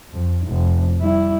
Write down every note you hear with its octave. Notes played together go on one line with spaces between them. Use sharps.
F2
F1
G3 E4